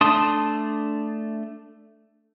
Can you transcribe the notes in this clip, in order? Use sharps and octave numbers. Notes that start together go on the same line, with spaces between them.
A3 D4 A5 C6 D#6